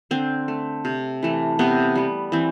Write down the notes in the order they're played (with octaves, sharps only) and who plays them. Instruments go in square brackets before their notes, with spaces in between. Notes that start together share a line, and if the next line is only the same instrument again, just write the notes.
[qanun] D3 C4
A3
C3
E3 A3
C3 B3
G3 B3
E3 C4